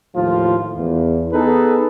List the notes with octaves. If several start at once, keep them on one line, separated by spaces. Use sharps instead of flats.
D#2 A2 F3 F4
E2
B3 D#4 G#4 A4 B4